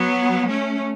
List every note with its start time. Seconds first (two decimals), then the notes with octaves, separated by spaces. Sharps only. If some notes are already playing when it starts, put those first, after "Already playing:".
Already playing: F#3 B3
0.48 A3 C#4